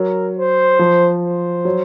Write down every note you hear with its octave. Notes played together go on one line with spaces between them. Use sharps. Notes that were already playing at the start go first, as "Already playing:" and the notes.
Already playing: F#3 A#4
C5
F3
C5
F#3